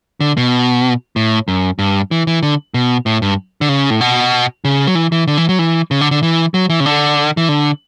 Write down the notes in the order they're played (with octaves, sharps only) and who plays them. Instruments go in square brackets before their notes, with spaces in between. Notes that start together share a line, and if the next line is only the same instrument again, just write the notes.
[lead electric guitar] D3
B2
A2
F#2
G2
E3
E3
D3
B2
A2
G2
D3
C#3
A2
B2
C#3
F#3
E3
E3
D3
E3
F#3
E3
C#3
D3
D3
E3
F#3
E3
C#3
D3
E3
D3